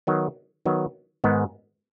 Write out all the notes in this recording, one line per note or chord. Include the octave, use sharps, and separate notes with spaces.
D#3 F#3 B3
D#3 F#3 B3
G#2 D#3 G#3 B3